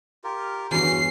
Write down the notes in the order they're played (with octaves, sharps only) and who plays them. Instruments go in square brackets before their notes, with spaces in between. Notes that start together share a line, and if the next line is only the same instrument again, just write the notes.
[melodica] F4 G4 A#4
[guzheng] E2 G2 [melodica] C#4 [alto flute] F#4 [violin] C7